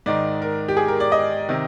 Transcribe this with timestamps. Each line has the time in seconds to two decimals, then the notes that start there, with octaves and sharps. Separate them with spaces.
0.06 G#2 D#3 D5
0.42 A#4
0.68 G4
0.77 G#4
0.88 A#4
1.00 D5
1.12 D#5
1.49 C3 D#3